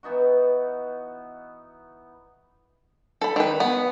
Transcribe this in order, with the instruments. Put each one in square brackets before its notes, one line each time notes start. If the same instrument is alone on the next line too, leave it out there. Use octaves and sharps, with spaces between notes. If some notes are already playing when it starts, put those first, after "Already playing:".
[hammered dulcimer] E3 B3 D#4 F#4
[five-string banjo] A4 B5
D#3 B4
B3